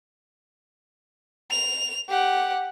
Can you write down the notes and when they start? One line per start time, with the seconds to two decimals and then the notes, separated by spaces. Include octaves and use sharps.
1.51 F7
2.08 G4 F#5